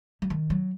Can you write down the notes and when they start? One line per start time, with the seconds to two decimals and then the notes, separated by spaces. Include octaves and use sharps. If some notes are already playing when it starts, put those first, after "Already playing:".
0.22 F#3
0.30 D#3
0.50 F#3